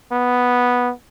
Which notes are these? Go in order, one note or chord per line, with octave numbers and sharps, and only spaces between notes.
B3